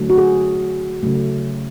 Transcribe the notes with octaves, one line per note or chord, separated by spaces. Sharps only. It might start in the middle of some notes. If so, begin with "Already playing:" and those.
Already playing: D3 F#3 A3
F#4
G#4
C#3 F#3 A3